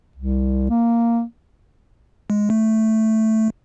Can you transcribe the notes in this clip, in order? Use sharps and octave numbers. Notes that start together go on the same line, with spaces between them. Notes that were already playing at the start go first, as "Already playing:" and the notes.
C2
A#3
G#3
A3